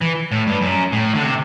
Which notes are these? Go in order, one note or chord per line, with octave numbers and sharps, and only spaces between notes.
E3
A2
G2
F#2
A2
D3
C3